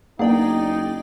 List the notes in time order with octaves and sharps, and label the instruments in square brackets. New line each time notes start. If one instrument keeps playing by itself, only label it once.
[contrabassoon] F#1 [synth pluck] A#3 B3 D4 [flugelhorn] D#4 [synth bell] G#4 D5 G5